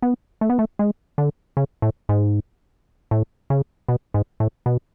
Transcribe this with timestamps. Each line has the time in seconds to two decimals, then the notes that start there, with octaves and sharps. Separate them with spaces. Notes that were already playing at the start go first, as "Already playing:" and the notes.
0.02 B3
0.41 A3
0.50 B3
0.59 A3
0.79 G#3
1.18 D3
1.57 C#3
1.82 A2
2.09 G#2
3.11 A2
3.50 C#3
3.88 B2
4.14 G#2
4.40 A2
4.66 B2